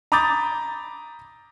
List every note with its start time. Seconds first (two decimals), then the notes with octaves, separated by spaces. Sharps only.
0.12 A#5 B5 D6 D#6 G6 A6